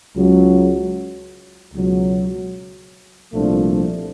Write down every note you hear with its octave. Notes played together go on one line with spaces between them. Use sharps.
C#2 C#3 F#3
C#2 B2 F#3
C2 A#2 F3 A3 D4